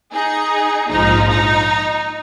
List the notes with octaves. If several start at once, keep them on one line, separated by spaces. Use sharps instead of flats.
D#4 G#4
A#1 G#2 F3 D#4
D#4